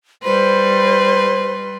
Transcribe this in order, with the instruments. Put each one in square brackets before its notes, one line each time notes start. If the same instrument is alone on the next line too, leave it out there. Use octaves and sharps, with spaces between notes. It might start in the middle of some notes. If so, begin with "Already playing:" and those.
[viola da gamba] G3 B4 [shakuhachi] C5 [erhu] C6